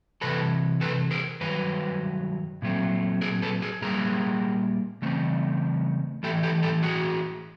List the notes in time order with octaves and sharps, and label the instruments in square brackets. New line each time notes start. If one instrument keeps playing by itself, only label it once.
[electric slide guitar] C3 E3 A4 B4
A4 B4
G#4 A#4
G2 D#3 F#3 B4
A#2 F#3 A3 C4
G#4 A#4
A4 B4
G#4 A#4
A#2 G3 A#3 G#4 A#4
C#3 E3 A3 C4
A2 E3 A3 G4 A4
G4 A4
G4 A4
F#4 G#4